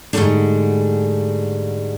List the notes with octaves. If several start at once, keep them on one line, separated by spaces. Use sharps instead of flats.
G#2 D3 F#3 G3 A3 D4